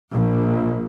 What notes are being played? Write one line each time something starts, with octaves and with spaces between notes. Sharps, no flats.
A#1